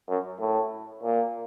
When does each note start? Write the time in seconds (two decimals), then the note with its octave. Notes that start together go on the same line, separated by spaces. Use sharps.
0.08 F#2
0.40 A2
1.03 A#2